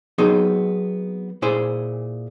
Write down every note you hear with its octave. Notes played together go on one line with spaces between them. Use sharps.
F#3 B3 C4 D#4 G#4
A#2 E4 G#4 C5